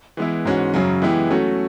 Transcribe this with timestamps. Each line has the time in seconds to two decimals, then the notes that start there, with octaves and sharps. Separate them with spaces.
0.17 E3 G#3 B3 E4
0.45 G#2 E3 G#3 C#4 F#4
0.74 F#2 C#3 F#3
1.02 E3 G#3 B3 E4 G4
1.30 F#3 A3 C#4 F#4 A4